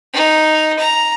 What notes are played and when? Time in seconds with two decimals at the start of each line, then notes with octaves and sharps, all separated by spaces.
0.13 D#4
0.79 A#5